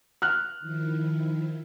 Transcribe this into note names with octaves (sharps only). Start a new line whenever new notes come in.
F6 F#6
D#3 F3 E4